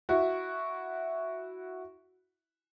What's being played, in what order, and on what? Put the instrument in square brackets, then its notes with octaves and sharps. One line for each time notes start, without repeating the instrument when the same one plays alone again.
[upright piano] E4 F#4